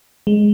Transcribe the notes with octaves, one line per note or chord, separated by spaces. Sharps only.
G#3